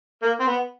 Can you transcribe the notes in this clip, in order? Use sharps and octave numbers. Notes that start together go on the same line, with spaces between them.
A#3
C4
B3